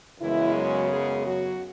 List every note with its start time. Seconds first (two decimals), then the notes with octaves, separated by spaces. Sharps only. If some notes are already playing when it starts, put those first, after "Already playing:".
0.19 F#2 C#3 E3 G#3 B3 E4
0.54 F#3 F#4
0.90 G#3 G#4
1.25 F#3 F#4